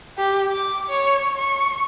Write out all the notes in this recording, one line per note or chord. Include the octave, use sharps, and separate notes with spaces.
G4
D6
C#5
C#6